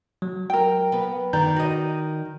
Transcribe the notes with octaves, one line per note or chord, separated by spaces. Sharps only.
F#3
A#4 G5
B3 B4
D#3 D5 A#5 G6
F#4 D#5